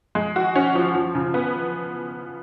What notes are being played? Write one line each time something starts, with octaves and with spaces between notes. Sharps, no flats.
G#3
F#4
C#4
F3
F3
C#3
B3